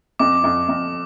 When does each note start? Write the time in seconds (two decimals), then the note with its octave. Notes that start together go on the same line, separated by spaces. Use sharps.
0.19 F2 D6
0.44 F2
0.68 F2